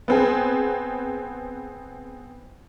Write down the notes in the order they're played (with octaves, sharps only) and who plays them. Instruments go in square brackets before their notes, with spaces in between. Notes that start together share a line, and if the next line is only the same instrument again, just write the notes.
[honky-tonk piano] B3 C4 G#4